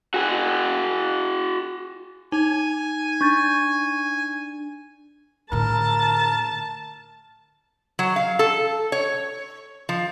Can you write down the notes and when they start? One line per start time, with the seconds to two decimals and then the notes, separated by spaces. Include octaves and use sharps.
0.14 F#4 G#4
2.32 D#4 G#5
3.21 D4 C#6 G6 A6
5.52 A2 D3 A#4 A5
7.99 F#3
8.16 F5
8.39 A4
8.92 C#5
9.89 F3